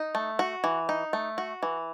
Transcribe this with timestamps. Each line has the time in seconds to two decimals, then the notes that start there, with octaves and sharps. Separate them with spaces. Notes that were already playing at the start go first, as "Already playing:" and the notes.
Already playing: D#4
0.15 A3
0.39 F#4
0.64 E3
0.89 D#4
1.13 A3
1.38 F#4
1.63 E3